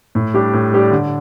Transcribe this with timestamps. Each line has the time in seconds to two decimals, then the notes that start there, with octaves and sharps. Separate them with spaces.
0.15 A2
0.34 G3 D4 G4 D5
0.53 A2
0.73 G3 D4 G4 D5
0.91 D3